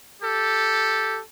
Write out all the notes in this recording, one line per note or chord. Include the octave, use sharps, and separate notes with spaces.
G4 A4